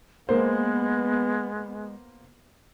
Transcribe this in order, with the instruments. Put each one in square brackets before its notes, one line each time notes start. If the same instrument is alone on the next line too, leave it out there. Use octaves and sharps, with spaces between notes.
[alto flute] G#3 [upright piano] A#3 C5 [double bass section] B3